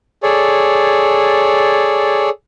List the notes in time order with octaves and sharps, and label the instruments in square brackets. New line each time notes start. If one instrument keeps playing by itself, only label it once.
[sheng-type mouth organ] G#4 A4 C#5 D5